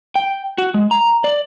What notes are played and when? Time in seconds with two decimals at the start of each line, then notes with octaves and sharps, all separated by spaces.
0.15 G5
0.58 F#4
0.74 G#3
0.91 A#5
1.24 D5